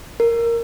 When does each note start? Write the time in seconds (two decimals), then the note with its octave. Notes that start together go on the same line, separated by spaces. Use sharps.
0.20 A#4